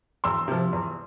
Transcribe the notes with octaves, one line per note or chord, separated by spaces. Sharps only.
E2 C6 E6
C3 F3
E2